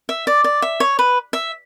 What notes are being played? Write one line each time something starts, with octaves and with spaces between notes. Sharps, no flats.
E5
D5
D5
E5
C#5
B4
E5